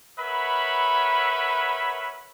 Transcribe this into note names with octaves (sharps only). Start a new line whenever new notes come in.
A#4 B4 C#5 E5 F#5 B5